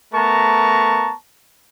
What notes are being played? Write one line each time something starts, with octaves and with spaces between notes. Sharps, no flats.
A3 B3 A#4 A5 A#5 C#6